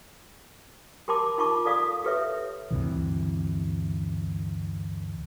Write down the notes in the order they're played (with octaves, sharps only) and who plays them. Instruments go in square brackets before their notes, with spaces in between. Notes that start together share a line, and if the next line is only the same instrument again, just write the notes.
[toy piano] G4 A#4 A5 C6 D6
D#4 F4 A5 C#6 D6
A4 D5 F5 D#6
G4 A4 B4 C#5 E5
[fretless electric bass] D2 G2 C3 E3